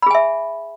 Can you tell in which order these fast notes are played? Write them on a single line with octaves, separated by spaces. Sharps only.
B5 G#4 G#5 E5